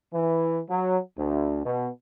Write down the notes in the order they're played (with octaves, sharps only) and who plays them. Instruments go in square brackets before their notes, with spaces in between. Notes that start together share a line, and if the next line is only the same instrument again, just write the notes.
[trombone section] E3
F#3
D2
B2